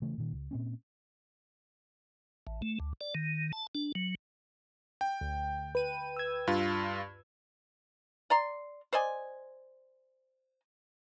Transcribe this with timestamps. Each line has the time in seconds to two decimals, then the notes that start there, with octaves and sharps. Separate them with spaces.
0.02 C#3 E3 A3
0.18 A#2 D#3
0.32 C#2
0.51 A#2 C4 C#4
2.47 A1
2.62 A3
2.80 D2
3.01 D5
3.15 D#3
3.53 A5
3.75 D4
3.95 F#3
5.01 G5
5.21 D2
5.75 B4 D#7
6.17 E6 G#6
6.47 G2 F4
8.30 D5 A#5 C6
8.93 C5 D5 D#5 G#5